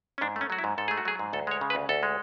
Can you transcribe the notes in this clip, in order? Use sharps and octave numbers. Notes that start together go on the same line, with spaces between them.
C#4
G#2 D4
A3
C#4
F#3 F#4
E4
G#2
G#2 A4
A3 G#4
F#4
F#3 G#4
G#2
D2 A4
G#3 C#5
C#3
B4
D2
D2 A4
G#3